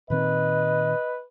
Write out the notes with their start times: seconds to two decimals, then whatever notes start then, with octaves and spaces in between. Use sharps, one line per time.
0.10 A#2 D#3 C4 B4 D#5